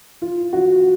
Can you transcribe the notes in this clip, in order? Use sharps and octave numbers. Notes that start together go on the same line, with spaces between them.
F4
F#4